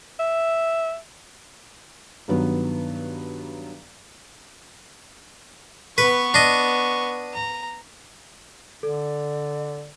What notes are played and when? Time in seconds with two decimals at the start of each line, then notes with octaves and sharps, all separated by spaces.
0.20 E5
2.28 G2 D#3 F#3 B3
5.98 B3 B4 C#6
6.34 D4 D#5
7.34 A#5
8.83 D3 A4 D5